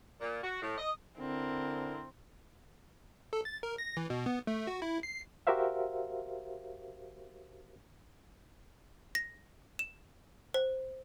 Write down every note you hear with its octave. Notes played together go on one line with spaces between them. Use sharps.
A#2
F#4
A2
D#5
D3 C4 E4 A#4
A4
A6
A#4
A#6
E3
B2
B3
A3
F#4
E4
C7
F#4 G4 A#4 C5 E5 F5
A#6
E7
C5